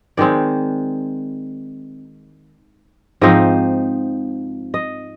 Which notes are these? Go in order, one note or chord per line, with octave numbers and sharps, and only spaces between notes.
D#3 G#3 C4 D5
G#2 F3 C4 D#4 D#5
D#5